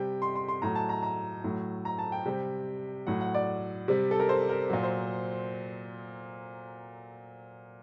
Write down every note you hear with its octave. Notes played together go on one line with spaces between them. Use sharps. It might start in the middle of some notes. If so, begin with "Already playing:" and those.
Already playing: C3 G3 G5
C6
C6
C6
A2 F#3 A#5
A5
A#5
A#5
A2 F#3
A#5
A5
G5
C3 G3
A2 F#3 F#5
F#5
D5
C3 G3
A4
A#4
C5
A#4
A#2 F#3
C5